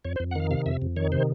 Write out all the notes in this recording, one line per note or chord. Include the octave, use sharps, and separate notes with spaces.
F2 C#5
C5
F2
F#5
D#3 F5
C3 F5
F2 E5
F2
D#3 C#5
C3 C5